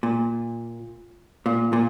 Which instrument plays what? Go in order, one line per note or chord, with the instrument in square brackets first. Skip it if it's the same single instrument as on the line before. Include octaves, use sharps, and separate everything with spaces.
[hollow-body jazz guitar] A#2
A#2
A#2